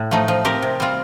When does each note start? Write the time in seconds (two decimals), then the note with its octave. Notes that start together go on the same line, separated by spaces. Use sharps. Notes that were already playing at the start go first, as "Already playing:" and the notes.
Already playing: A2
0.11 F3 A3 D#4
0.28 F3
0.45 C4 G4 A#4
0.62 C3
0.80 G3 C4 F4